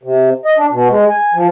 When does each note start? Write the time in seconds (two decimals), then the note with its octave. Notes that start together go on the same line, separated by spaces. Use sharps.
0.03 C3
0.45 D#5
0.58 D4
0.71 B2
0.90 G#3
1.09 G#5
1.34 F3